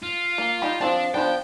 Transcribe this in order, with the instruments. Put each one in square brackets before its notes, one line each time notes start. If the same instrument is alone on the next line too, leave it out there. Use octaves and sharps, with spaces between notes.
[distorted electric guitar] F4
[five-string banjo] A#3
G3 D#4 G4
[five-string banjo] F3 C4 A5 [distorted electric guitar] D4
[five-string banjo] F3 B3 D4 [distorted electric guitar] G5